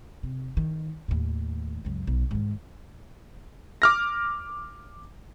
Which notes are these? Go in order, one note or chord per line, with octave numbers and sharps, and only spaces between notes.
C3
D#3
D#2 A2
C#2 F#2
B1
G#2 D#3
D6 F6 A#6